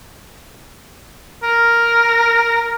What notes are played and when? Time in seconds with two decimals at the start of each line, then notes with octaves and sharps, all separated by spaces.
1.43 A#4